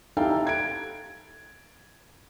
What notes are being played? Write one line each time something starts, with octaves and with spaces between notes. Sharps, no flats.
D#4 E4 G4 A4 F5 G5
G#6 D7